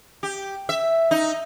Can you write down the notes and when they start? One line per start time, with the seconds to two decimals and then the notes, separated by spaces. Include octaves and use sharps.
0.23 G4
0.69 E5
1.11 D#4